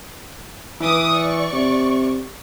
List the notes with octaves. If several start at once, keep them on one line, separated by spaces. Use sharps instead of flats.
E3 B4 D6 D#6
D5 C#6
C3